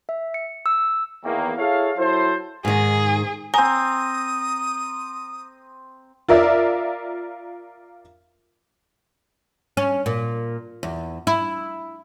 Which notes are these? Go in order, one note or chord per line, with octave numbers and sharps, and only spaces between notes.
E5
C#7
E6
E2 D#3 A#3
E4 G#4 A4 C#5 F5
F#3 E4 A4 C5
G#2 D#3 G#4
C4 G#5 A#5 D#6
F4 A#4 D5 E5
C#4
A#2
E2
E4